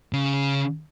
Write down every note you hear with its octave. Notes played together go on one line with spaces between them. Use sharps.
C#3